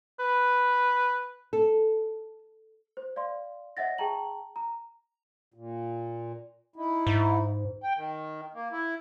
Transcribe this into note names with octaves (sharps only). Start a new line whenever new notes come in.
B4
A4
C5
D5 F5 C6
C#5 D#5 E5 F#5 A6 A#6
G#4 G5 A5 A#5 F#7
A#5
A#2
D#4 E4
G#2
G5
D#3
A#3
E4